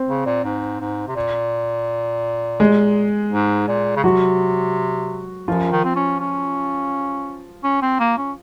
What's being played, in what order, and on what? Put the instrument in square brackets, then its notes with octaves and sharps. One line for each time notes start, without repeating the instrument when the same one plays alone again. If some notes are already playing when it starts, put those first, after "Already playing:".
Already playing: [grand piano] C4
[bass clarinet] C#3
A#2
G#2
G#2
C3
A#2
[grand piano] G#3 G#4
[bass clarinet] G#2
A#2
C#3
[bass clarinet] C3 [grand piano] F#3 F#4
[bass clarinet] F#2 [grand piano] F3 F4
[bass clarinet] D#3
C4
C#4
C#4
C#4
C4
A#3
C#4